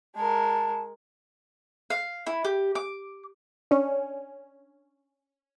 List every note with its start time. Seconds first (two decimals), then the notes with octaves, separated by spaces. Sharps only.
0.16 G#3 A#4 A5
1.90 F5
2.27 E4
2.45 G4
2.75 D6
3.71 C#4 D4